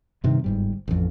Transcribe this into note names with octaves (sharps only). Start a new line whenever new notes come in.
G2 C3 D#3
G1 G#2 G3
A1 F2